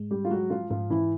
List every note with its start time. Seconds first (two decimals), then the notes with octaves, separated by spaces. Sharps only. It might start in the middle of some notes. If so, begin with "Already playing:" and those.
Already playing: G#2 G#3
0.11 G3 G4
0.25 F4
0.30 F#3 G#3 F#4
0.50 F3 F4
0.70 G#2 F3 F4
0.90 E3 E4